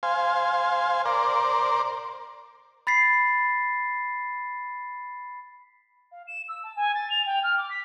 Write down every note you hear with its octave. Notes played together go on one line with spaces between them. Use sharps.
C5 F5 G#5
A#4 C5 D5
B5 A6 B6 C7
F5
E7
E6
A5
G#5
A6
F7
G5
F6
D6
B6